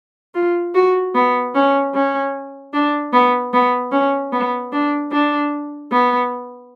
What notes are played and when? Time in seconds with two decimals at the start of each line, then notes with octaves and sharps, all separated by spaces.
0.34 F4
0.75 F#4
1.15 B3
1.55 C#4
1.94 C#4
2.74 D4
3.13 B3
3.54 B3
3.92 C#4
4.32 B3
4.72 D4
5.12 D4
5.92 B3